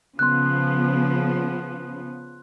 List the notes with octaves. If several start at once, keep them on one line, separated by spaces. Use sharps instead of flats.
C#3 F3 B3 C6 F#6